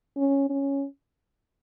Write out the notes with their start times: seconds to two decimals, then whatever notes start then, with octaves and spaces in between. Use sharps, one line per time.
0.17 C#4
0.50 C#4